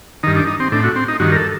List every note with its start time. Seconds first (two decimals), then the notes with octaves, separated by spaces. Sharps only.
0.23 G2 D#3 D#4
0.36 D4
0.47 D#4
0.60 C4
0.72 A2 D4
0.84 F#4
0.96 C4
1.08 D#4
1.20 G2 D#3 F#4
1.32 A#4
1.36 A4